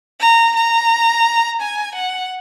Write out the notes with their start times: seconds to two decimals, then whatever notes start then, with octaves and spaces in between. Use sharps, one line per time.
0.20 A#5
0.56 A#5
1.61 G#5
1.95 F#5